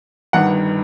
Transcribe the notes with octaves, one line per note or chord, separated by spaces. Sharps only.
G1 G2 D#3 F#5